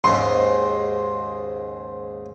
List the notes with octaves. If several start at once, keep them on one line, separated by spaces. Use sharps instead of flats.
D#2 G#2 C#3 C6